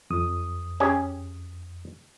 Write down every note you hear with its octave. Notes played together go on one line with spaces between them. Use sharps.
F2 D#6
C#4 G4 G#4